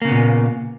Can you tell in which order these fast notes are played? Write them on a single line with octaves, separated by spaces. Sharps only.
A#3 C#3 B3 A#2